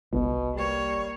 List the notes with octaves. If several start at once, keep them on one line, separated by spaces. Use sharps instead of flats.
G1 C2 B2
G3 A#3 C#5